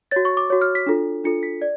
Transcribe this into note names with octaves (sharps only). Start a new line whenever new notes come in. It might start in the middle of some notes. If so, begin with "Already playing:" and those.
F#4 C#5 A6
C#6
D6
F#4 C#5
F6
B6
D4 F4 A4
D4 F4 A4 C#7
B6
D5